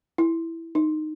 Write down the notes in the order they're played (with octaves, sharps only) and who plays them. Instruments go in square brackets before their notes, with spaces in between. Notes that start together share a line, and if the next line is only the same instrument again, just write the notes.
[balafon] E4
D#4